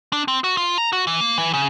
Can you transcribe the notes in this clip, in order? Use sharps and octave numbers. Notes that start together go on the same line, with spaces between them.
D4
C4
F#4
F4
A#5
F#4
E3
A#3
E3
C#3